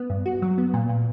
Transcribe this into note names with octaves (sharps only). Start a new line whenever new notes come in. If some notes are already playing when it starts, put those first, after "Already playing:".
Already playing: B3
G2
F#4
F#3
B3
A#2
A#2